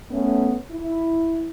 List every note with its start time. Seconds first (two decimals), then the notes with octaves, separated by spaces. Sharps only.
0.11 A3 B3 C#4
0.72 E4